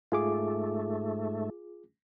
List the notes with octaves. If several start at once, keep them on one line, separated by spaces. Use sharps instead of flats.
G#2 A3 F4 G#4 D6